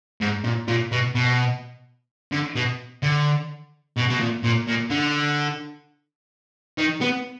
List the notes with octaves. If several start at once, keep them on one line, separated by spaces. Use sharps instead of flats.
G#2
A#2
A#2
B2
B2
D3
B2
D3
B2
B2
A#2
A#2
A#2
D3
D#3
B3